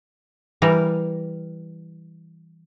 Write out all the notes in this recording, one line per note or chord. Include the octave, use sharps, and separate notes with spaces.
E3 G3 A#4